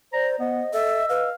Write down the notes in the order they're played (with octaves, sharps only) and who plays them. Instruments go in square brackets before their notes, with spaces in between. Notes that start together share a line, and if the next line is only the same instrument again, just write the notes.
[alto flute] C5 [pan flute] D5 [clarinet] A#5
[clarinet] B3 [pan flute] C5 [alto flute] D#5
[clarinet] A4 [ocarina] E5 [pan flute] E6
[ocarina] B4 [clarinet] F5